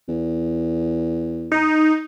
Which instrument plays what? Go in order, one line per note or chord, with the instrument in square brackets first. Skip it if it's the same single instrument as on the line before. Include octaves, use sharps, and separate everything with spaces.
[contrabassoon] E2
[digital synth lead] D#4